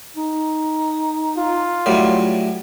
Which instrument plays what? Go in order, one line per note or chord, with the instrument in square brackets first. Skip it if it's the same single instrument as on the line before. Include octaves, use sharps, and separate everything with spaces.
[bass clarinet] D#4
[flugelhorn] F4
[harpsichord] A2 F#3 G3